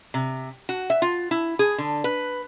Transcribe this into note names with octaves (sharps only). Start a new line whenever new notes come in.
C3
F#4
E5
F4
E4
G#4
D3
B4